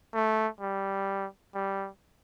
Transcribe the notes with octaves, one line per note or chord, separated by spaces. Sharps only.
A3
G3
G3